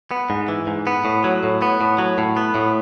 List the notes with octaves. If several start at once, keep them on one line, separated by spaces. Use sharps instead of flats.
B3
G#2
E3
G#2
B3
A2
F#3
A2
B3
A2
F#3
A2
B3
A2